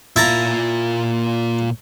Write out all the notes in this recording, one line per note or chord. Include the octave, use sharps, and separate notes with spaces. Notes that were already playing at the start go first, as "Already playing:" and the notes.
A#2 E4 F4 A5 A#5